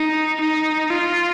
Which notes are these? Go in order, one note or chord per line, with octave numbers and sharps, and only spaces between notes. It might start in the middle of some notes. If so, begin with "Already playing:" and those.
Already playing: D#4
D#4
F4